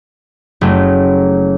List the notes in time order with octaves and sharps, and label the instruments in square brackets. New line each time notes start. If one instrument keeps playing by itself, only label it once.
[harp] F#1 F#3 A3